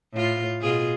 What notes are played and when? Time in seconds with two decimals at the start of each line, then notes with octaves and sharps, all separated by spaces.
0.13 A2 F4
0.61 B2 F4 G#4